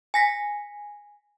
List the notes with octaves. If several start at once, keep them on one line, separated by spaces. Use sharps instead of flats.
G#5 A#6 B6